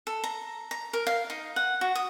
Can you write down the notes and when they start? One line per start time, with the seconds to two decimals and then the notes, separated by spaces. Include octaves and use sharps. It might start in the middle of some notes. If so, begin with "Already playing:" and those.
0.07 A4
0.24 A#5
0.71 A#5
0.93 A#4
1.07 F5
1.30 D#4
1.56 F#5
1.81 F#4
1.95 D#6